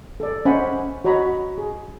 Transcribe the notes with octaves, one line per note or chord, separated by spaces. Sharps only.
A4 D5
C#4 C5 D#5 F#5 G#5 B5
F#4 C#5 D#5 A#5 B5
G#4